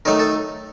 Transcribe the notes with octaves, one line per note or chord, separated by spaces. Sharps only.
D#3 F#3 A3 D#4 A#4
A4